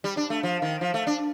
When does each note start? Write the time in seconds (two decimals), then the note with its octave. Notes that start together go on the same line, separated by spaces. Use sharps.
0.04 G3
0.17 D4
0.30 A3
0.43 F3
0.62 D#3
0.81 F3
0.94 A3
1.07 D4